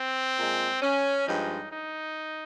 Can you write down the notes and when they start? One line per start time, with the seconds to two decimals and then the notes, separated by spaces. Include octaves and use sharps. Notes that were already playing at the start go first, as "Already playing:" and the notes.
Already playing: C4
0.37 A#2 G#3
0.82 C#4
1.27 G2 F3 G#3 D#4
1.72 D#4